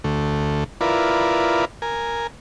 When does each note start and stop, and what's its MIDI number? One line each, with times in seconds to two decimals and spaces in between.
0.04 0.64 38
0.04 0.64 57
0.81 1.65 64
0.81 1.65 65
0.81 1.65 70
0.81 1.65 71
0.81 1.65 74
1.82 2.27 70
1.82 2.27 80